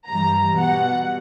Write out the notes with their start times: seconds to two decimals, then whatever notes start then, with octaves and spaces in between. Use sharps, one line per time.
0.08 G2 E3 G3 A#5
0.57 B2 G3 F#5